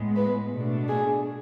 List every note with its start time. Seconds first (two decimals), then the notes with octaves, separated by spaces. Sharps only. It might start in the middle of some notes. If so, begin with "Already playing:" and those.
Already playing: A2 G#3 B3
0.16 B4
0.52 B2 A3 D4
0.89 G#4